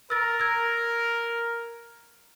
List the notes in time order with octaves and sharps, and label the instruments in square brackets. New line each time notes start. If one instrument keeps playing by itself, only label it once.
[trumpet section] A#4 [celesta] E6 A6
[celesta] E6 G#6